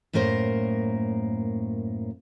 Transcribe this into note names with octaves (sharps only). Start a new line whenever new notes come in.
F#2 A2 A#3 A#4 C5